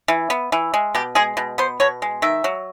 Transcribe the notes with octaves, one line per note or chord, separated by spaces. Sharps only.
E3
B3
E3
G#3
B2 G4
G#3 G#4
B2
B3 C5
B2 C#5
G#3
D#3 E5
F#3